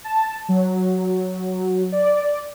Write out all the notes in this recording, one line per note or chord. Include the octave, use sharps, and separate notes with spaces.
A5
F#3
D5